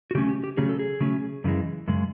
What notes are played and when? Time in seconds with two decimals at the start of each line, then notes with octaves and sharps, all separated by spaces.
0.11 F#4
0.15 C#3 F#3 A3 C#4 G4
0.29 G4
0.44 G4
0.57 C#3 F#3 A3 C#4 G#4
0.69 A4
0.79 G#4
1.00 C#3 F#3 A3 C#4
1.44 F#2 C#3 E3 G#3
1.88 F#2 C#3 G#3